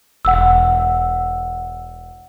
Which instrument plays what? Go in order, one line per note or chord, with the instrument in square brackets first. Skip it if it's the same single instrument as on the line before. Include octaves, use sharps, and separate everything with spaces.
[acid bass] E1 [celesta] F#5 E6